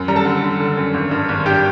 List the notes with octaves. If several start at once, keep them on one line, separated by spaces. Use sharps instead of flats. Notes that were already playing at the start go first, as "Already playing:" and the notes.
Already playing: F#2
G3 A#5
A4 A5
D3
D3
D3
F#2
G#1
G2
G#1
G2 G4 G5